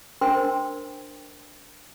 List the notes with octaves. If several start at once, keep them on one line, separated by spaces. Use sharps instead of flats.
D4 A#4 C5 G5 C6 E6